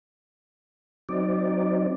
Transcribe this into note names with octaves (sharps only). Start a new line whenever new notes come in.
F#3 C4 D#4 D5